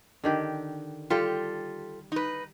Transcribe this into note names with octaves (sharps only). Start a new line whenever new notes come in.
D3 D#3 G4
G3 F4 G4 A4
D#4 B4